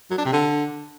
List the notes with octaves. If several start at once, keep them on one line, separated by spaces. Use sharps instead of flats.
F#3
D4
C3
D3